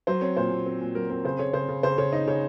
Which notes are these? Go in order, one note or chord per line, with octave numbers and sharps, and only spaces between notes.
F#3 C5
C4 C#5
A#2 C5
A#2
C4
A#2
F#3 A#4
C4 A#4
C#3 C5
C#3 C#5
C#3 C5
C#3
C#3 C5
C#3 C#5
D#4 D#5
C#3 C#5